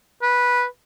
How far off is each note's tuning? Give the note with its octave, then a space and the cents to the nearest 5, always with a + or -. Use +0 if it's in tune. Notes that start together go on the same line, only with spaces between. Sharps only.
B4 -10